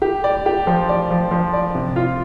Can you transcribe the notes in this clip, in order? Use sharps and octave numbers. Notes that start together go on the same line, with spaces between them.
G4
D5
G4
F3
D5
F3
F3
D5
C3
F4